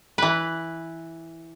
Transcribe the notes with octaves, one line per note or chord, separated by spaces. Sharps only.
E3 B4